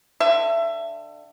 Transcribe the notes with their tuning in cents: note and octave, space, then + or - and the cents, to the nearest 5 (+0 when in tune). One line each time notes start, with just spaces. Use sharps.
D3 +20 E5 +25